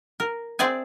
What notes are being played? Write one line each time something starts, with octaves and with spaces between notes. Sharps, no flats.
A#4
C4 G#4 D5 E5 G#5